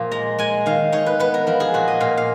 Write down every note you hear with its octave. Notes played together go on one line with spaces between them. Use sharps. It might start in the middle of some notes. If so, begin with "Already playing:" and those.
Already playing: A#2 F3 F5
G#3 A#5
G#3 G#5
D#3 F5
D#4 C#5
B4
B3 B4
A#4
F3 A#4
G#4
A#2 F#4
D#5
A#2 F5
F5